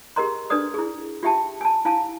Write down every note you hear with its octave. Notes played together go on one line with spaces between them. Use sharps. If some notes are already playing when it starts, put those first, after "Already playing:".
G4 G#4 A#4 D#5 A#5 C6
D4 A4 B4 D5 D#6
E4 G#4
F4 G4 E5 G5 A5
G#5 A5
E4 F5 G#5 A5